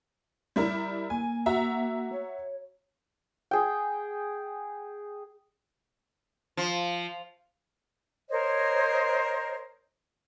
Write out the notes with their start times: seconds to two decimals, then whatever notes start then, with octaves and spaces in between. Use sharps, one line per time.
0.56 G3 E4 A#4
1.10 A#3 G#5
1.46 F#4 E5 A#5
2.12 C#5
3.51 G#4 G5
6.57 F3
8.30 A#4 C5 C#5 D#5